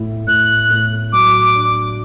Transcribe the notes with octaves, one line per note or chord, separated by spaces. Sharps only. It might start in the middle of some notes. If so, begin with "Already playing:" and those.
Already playing: A2 E4
A2 F#6
A2
F#3 D6
D6
D4